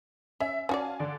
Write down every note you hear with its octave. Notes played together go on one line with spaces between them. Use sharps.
C#4 E5
C#4 F#4 D5 F5 G#5 A5
D3 D5